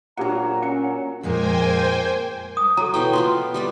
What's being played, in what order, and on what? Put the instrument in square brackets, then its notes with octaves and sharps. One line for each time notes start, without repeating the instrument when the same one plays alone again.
[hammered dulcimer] A#2 F#3 [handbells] D4 G4 F#5 [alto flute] A#5
[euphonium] C#4 [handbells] F#5 C#7
[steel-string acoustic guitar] F2 A#2 G#3 [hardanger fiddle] A#3 [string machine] C5 G5 G#5
[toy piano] D#6
[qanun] F#3 [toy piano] A4 A#5
[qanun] B2 E3 G5
[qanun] B3 F4 A#4 [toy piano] C6
[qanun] G3 B3 D5